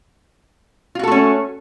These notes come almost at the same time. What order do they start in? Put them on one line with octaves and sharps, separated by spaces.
F4 F#4 A4 A3 C#4